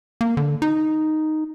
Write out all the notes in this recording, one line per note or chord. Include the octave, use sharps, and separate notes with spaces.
A#3
D3
D#4